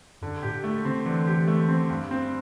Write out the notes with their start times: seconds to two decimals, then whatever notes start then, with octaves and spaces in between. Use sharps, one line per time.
0.21 F#2 D3
0.43 A2 G4
0.64 A3
0.85 D3 C4
1.05 D3 E3
1.27 G4
1.48 A3
1.69 C4
1.89 G2
2.11 C4